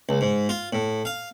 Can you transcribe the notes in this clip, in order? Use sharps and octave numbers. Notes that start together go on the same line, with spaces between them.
C#2
G#2
F4
A2
F5